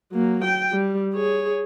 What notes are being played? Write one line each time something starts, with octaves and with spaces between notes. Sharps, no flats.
F#3 A#3
G5
G3
G#4 C#5